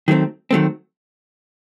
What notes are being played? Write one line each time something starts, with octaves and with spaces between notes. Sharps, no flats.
D#3 F#3 A3 C4
D#3 F#3 A3 C4